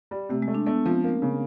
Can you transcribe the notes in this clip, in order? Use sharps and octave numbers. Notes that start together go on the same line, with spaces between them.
G3
C3 A3
G#3
A3
D4
A3 B3
F3 C4
A#3
C#3